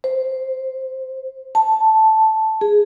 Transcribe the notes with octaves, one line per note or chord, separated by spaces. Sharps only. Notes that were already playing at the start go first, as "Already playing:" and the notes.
C5
A5
G#4